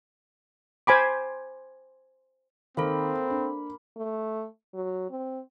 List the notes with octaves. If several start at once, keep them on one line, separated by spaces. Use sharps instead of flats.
C5 G#5 B5 D6
D#3 A#3 C4 A4 C5 F5 B5
D4
A3
F#3
C4